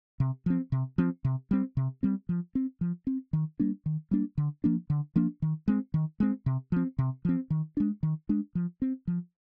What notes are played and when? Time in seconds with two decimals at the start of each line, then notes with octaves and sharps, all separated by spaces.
0.20 C3
0.46 F3 C4
0.72 C3
0.98 F3 C4
1.25 C3
1.51 G3 C4
1.77 C3
2.03 G3 C4
2.29 F3
2.55 C4
2.81 F3
3.07 C4
3.33 D#3
3.60 G3 A#3 D4
3.86 D#3
4.11 G3 A#3 D4
4.38 D3
4.64 F3 A#3 D4
4.90 D3
5.16 F3 A#3 D4
5.42 D#3
5.68 G#3 C4
5.94 D#3
6.20 G#3 C4
6.46 C3
6.72 F3 C4
6.98 C3
7.25 F3 C4
7.50 D#3
7.77 G#3 D4
8.03 D#3
8.29 G#3 D4
8.55 F3
8.82 C4
9.07 F3